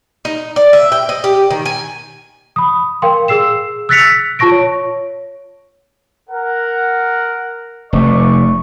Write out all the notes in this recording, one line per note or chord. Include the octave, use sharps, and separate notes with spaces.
D#4
D5
E5
G5
D#5
G4
D#3
G#5
B5 D#6
A#4 F5 G5 C6
G#4 E6 C7 E7
E6 F#6 A6 B6 C#7 F7
F4 A5 C#6 A#6 D7
C#5
A#4 F#5
F1 A3 D5 C#6